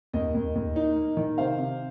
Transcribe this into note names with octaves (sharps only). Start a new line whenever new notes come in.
D#2 D#5
D#2
D#2
D#4
A#3
D#3
C3 C5 F5
C3